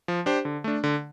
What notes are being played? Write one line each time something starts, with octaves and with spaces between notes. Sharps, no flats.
F3
D4 G4 C5
D3
A3 D4
D3